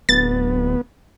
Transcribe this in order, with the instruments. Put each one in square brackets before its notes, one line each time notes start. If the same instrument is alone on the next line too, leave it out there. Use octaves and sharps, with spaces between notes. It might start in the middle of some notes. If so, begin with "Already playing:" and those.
[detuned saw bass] D1 [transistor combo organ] B3 [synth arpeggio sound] A6